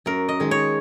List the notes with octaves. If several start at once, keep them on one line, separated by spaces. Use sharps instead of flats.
F#2 A#4
D#5
D#3 G#3
C#5